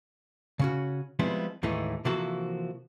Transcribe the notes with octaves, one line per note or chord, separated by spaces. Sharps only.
C#3 C#4 F#4
F3 G3 G#3 B3 C4 E4
D#2 A2 E3 G#3 A3 D#4
C3 E3 F3 A#3 F#4 A4